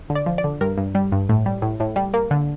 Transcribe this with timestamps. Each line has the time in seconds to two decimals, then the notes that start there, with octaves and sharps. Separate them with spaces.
0.10 D3
0.15 D5
0.26 F3
0.38 D5
0.44 D3
0.61 G2 A#4
0.78 G2
0.95 G3
1.12 G2
1.29 A2
1.46 G3
1.62 A2
1.80 A2
1.96 G3
2.14 A#3
2.31 D3